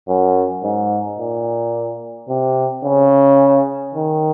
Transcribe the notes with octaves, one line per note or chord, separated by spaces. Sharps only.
F#2
G#2
A#2
C3
C#3
D#3